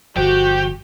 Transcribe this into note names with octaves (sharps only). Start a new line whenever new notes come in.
G1 F3 F#4 G4